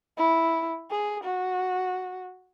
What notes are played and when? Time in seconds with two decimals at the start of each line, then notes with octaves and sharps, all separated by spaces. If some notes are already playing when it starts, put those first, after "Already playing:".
0.18 E4
0.90 G#4
1.24 F#4